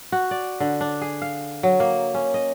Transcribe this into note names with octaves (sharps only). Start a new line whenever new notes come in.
F#4
D5
D3
D4
G#4
F5
F#3
A#3
C#4
D#5